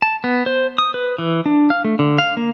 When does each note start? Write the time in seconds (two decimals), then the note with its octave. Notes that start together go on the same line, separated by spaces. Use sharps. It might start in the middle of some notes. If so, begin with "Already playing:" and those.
0.02 A5
0.24 B3
0.46 C5
0.78 D#6
0.94 B4
1.18 E3
1.46 D4
1.70 F5
1.85 A3
1.99 D3
2.18 F5
2.37 A#3